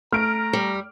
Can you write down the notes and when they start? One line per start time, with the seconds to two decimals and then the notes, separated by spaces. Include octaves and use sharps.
0.13 A3 A#5 F6 D7
0.53 G3